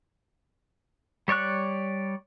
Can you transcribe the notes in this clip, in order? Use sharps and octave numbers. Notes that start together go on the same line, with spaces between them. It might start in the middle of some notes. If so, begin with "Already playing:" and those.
G3 C#5 D5 C#6 F#6